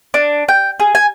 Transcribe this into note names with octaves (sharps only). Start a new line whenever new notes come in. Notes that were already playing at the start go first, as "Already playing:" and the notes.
D4
G5
G#4
G#5